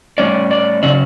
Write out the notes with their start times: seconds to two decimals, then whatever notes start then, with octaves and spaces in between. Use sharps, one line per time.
0.18 A2 G3 C#4 D5
0.51 D5
0.83 C#3 F#3 C#4 D5